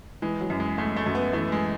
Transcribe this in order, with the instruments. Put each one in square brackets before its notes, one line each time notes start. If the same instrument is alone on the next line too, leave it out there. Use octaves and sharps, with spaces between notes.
[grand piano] E3 [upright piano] G#3
[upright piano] F#3
[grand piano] F#2
[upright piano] G#3
[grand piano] G#3 [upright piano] A3
[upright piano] A3
[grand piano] F#2
[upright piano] B3
[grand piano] E3 [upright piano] A3
[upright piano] G#3